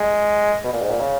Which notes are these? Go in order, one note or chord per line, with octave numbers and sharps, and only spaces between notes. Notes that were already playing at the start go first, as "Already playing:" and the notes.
Already playing: G#3
B2
A#2
G#2
A#2
C#3